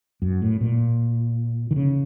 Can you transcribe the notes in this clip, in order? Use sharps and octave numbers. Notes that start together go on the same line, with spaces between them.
F#2
A2
A#2
D#3
C#3